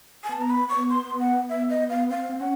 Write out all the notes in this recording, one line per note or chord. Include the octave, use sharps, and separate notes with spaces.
G#5
B3 A5
A#5
B5
C#6
C6
F#5
E5
D#5
F5
C4 F5
C4
C#4 F#5